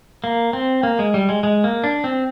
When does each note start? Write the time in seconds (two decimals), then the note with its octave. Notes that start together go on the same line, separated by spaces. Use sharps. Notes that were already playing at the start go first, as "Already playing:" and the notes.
0.24 A#3
0.53 C4
0.83 A#3
0.99 G#3
1.14 G3
1.29 G#3
1.43 G#3
1.64 A#3
1.84 D4
2.04 C4